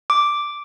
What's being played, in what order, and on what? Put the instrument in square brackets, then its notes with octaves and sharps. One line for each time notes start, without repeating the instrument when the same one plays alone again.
[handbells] D6